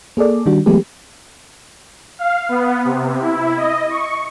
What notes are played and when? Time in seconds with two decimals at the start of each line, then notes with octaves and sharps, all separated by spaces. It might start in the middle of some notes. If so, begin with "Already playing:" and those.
0.17 A#3 G#4 A4 D5
0.46 D#3 G3 D4 F#4
0.66 E3 F#3 G#3 A3 B3 G4
2.19 F5
2.49 B3
2.85 C3
3.21 E4
3.57 D#5
3.90 C#6